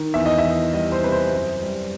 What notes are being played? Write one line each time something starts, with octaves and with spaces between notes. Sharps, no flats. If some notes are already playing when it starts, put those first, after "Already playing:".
Already playing: D#3
E2 E5
D#5
E5
E3
G3 D#5
C5
C3 B4
C5
F#2
G3